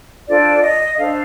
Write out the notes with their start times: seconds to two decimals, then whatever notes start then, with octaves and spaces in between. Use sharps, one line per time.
0.28 D4 F4 A4 C5 D5
0.63 D#5
0.97 D4 A4 C5 F5